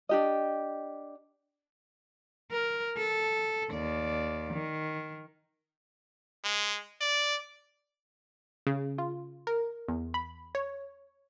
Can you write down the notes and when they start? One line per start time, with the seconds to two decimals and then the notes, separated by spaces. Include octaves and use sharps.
0.09 D4 G4 D#5
2.50 A#4
2.97 A4
3.71 D#2 D5
4.54 D#3
6.44 G#3
7.01 D5
8.67 C#3
8.98 F4
9.47 A#4
9.88 E2
10.14 B5
10.55 C#5